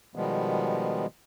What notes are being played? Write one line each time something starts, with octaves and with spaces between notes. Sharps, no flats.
B2 D#3 F3 G3 G#3 B3